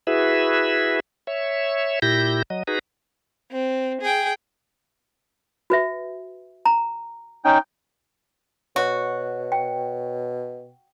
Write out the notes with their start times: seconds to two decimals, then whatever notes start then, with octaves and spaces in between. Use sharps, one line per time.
0.07 E4 F#4 G#4 B4 E5
1.27 C#5 E5
2.02 A#2 E4 G4 G6 A#6
2.50 F#3 D#5
2.67 D#4 F#4 G#4 B4 A#5
3.51 C4
4.01 G#4 G5
5.70 F#4 B4 E5
6.65 A#5
7.45 C#4 D#4 G5
8.76 B2 F#4 C#5
9.52 G5